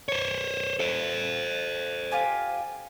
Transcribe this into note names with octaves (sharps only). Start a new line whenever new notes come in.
C5 C#5
A4 C5
F4 G4 G#5